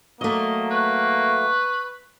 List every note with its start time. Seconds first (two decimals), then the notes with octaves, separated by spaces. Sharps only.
0.21 F#3 A3 A#3 D#5
0.71 B4 C#6